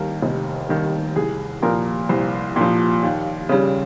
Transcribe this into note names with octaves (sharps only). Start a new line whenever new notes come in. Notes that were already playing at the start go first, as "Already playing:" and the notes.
Already playing: D#2 D#3 G3 A#4
F1
D#2 D#3 G3
C2 G#4
A#2 F3 A#4
C2 C5
A#2 F3
D#2
C#3 G3